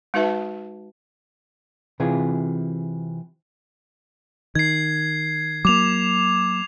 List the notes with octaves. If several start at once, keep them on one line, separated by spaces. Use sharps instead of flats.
G#3 D#4 F#4 B4 E5 A5
C3 E3 F4 G#4
D#3 G#6 C7
F#3 A#3 D6 F7